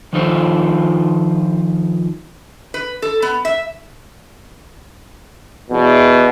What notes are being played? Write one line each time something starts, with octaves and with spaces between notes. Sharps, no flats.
D#3 F3 D#4 F4 A4 C5
B4
A4
B3
E5
E2 B2